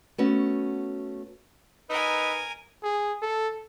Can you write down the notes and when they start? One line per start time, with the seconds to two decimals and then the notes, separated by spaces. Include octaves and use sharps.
0.18 A3 B3 C#4 F#4
1.90 D#4 A#4 B4 G#5 E6
2.84 G#4
3.22 A4